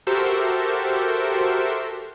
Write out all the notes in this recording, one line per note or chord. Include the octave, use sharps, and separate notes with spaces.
F#4 G4 A4 A#4 C5 E5